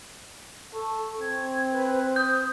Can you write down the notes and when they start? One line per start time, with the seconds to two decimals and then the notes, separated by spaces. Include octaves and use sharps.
0.73 A4 C#6
1.21 C4 G#6
1.72 B4 C5
2.16 D#6 G6